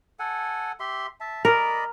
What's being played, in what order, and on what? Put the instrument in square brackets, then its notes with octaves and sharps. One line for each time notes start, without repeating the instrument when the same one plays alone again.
[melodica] A4 F#5 G#5
G4 E5 C6
E5 A5
[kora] A#4 [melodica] D5 D#5 B5